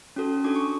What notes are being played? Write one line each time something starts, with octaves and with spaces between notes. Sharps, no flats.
C#4 F#4 A4
D4 F#4 A4 D6
C#6